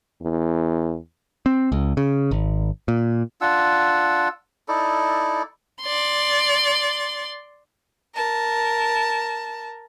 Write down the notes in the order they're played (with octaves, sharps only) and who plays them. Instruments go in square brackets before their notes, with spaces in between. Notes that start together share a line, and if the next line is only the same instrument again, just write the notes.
[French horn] E2
[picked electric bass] C4
C#2
C#3
G#1
A#2
[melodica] D4 F4 F#5 E6
D#4 E4 A4 D5
[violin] D5 C6
A#4 A5